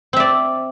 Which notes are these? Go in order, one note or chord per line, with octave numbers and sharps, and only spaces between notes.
C4 D5 E5